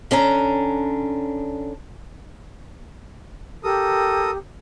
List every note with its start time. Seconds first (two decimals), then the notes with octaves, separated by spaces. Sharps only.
0.11 D3 C#4 D4 A#5
3.64 G4 A4 A#4 D#6